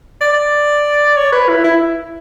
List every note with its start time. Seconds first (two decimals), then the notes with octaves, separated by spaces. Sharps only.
0.21 D5
1.17 C#5
1.32 B4
1.48 E4
1.64 E4